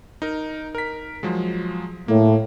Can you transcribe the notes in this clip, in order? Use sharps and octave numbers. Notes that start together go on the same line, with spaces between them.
D#4 A#4
A#4 B6
F3 F#3 G#3
A2 A#3